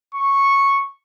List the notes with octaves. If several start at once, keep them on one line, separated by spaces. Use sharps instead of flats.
C#6